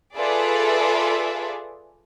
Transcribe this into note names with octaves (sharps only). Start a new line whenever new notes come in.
F4 G#4 A4 B4 D5 E5